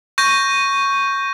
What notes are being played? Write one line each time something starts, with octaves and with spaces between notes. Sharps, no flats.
C#6 G6 A#6 D#7